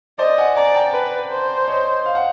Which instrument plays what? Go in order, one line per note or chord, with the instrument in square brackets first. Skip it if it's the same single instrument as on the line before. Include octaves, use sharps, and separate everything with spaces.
[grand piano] C5 D5 [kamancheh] D#5
[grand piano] F#5 G#5
[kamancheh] D5 [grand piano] G#5 A#5
[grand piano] G5 A5
[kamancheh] B4
C5
[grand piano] C#5 D#5
F5
F#5